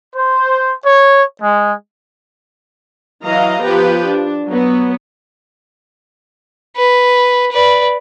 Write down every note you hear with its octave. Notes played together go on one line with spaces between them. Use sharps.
C5
C#5
G#3
E3 F#3 D#5 F5 A#5
F3 B3 G4 B4
D4
F#3 B3
B4
B4 D5